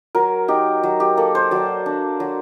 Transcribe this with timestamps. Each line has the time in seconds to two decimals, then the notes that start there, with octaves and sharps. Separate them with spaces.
0.15 F#3 A#4
0.48 D#4 G4
0.83 F#3
1.00 G4
1.17 A#3 A4
1.35 C5
1.51 F#3 D5
1.86 D4
2.20 F#3